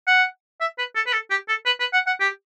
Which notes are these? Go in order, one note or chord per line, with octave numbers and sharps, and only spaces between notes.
F#5
E5
B4
A4
B4
A4
G4
A4
B4
B4
F#5
F#5
G4